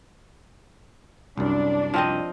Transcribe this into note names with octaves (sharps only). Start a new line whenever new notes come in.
C2 F#2 D4
F3 C4 D#5